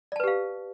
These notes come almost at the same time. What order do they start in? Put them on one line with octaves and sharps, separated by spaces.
D5 A5 B4 G4 F5